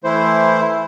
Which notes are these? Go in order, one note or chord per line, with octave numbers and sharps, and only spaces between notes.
E3 A3 E4 C5